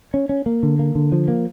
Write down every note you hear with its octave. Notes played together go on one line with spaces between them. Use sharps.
C#4
C#4
A#3
D3
A#3
D3
F3
A#3